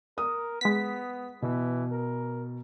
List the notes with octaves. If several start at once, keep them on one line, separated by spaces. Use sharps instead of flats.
A#4 D#6
G#3 B3 B6
B2 E3
A#4